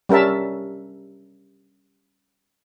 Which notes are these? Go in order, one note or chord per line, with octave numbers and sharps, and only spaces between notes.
G3 C#4 A#4 E5 A5